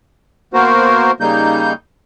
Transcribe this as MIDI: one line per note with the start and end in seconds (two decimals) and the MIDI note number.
0.53 1.11 58
0.53 1.11 59
0.53 1.11 66
0.53 1.11 70
0.53 1.11 72
1.20 1.73 49
1.20 1.73 55
1.20 1.73 58
1.20 1.73 63
1.20 1.73 91